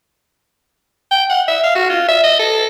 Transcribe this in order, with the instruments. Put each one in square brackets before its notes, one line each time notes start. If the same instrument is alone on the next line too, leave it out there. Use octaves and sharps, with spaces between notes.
[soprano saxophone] G5
F#5
E5
F5
F#4
F4
E5
D#5
A4